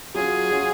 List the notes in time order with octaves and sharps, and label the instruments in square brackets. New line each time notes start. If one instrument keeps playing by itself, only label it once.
[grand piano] F#3 C#4 F4 [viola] G#4
[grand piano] F#3 C#4 F4